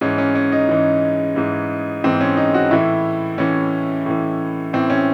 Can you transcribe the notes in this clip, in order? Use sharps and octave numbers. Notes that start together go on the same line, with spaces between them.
G#2 E3 C#4
C#4
C#4
D#4
G#2 E3
G#2 E3
G#2 E3 C4
C#4
D#4
F#4
A2 E3 E4
A2 E3 C#4
A2 E3
A2 E3 C4
C#4